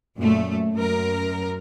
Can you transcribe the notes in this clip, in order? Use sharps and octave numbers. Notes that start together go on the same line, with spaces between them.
F#2 A#2 A3
F#2 A#4